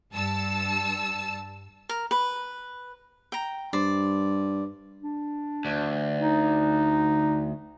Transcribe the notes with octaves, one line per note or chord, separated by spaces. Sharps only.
G2 A5 E6
A#4
B4
G5 A#5
G2 C5 D5
D4
D2
D#4